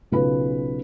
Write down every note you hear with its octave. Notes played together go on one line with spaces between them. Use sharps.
B1 C#3 F4 B4 B5